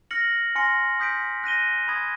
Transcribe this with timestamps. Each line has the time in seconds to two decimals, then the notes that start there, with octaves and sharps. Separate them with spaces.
0.11 F6 A#6 C#7 F#7
0.55 G#5 C6 F6 A#6 C#7
1.00 D#6 G6 B6 D7
1.44 F#6 A#6 D#7 G7
1.88 B5 D#6 G#6